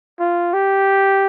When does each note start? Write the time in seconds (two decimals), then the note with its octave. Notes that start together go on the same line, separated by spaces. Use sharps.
0.19 F4
0.53 G4